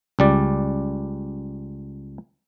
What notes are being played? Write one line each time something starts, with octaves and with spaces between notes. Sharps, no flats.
C#2 G3 D5